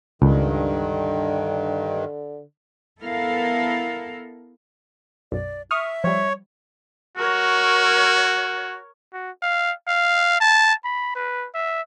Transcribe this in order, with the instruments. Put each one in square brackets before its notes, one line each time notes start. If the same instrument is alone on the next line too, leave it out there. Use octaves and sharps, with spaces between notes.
[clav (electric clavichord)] C#2 [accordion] G2 D#3 [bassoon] D3
[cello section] B3 E4 A4 A#4 F5
[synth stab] B1 F#2 [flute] D5
[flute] E5 [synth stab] C#6 D#6 F6
[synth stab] F3 G3 [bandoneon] C#5
[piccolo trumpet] F#4 [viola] A#4 C#5
[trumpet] F#4
F5
F5
A5
B5
B4
E5